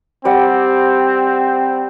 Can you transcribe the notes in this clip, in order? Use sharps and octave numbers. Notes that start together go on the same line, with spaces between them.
G3 C4 D5 F#5